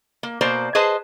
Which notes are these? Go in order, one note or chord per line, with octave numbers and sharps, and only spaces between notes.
A#3
B2 A#3 C5 D5 A#5
G#4 B4 C5 D#5 A5